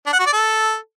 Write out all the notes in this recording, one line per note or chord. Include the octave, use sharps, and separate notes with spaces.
D4
F#5
F#4
D5
A4